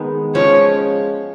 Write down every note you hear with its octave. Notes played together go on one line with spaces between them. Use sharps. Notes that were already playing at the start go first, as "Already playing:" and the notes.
Already playing: D#3 G#3 B3
F3 G#3 C#4 C#5